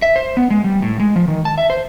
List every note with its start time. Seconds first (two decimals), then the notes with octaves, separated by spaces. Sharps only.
0.02 E5
0.16 C5
0.37 B3
0.50 G#3
0.64 G3
0.82 A2
1.00 G#3
1.16 F3
1.28 D#3
1.45 A5
1.58 E5
1.70 C5